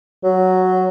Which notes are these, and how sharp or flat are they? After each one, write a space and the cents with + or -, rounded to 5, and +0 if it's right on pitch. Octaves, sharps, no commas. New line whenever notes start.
F#3 +0